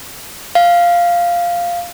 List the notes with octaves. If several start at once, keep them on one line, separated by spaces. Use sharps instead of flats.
F5